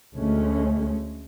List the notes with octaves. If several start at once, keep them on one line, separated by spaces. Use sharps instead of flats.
D2 G#3 A3 C#4